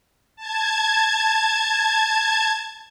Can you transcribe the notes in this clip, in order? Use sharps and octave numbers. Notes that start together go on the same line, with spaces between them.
A5 G#6